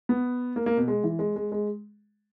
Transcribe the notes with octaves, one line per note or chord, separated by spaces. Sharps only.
B3
A#3
A#3
B2
G#3
E3
G#3
G#3
G#3